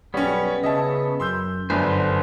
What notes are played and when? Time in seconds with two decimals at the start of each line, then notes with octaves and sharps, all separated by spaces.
0.14 B1 G3 B3 C#4 C#5
0.63 C#3 D#5 E5 A5
1.20 F#2 C6 E6 G6
1.70 G1 F#2 D3 D4 B4 C5